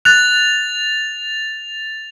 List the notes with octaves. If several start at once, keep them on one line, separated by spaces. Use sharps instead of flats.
F#6 A6 F7